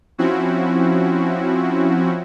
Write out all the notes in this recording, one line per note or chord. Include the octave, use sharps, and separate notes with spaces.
F3 C4 C#4 E4 F#4